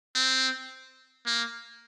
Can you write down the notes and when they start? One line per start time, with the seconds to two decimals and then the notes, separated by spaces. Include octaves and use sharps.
0.15 C4
1.27 A#3